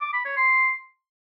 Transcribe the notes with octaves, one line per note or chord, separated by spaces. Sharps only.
D6
B5
C#5
C6